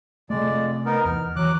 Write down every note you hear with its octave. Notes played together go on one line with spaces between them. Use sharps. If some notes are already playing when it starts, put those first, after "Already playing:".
F2 C3 G#3 A3 D5
B3 D#4 A#4
E2 F6
E3 F#3 D6 F#6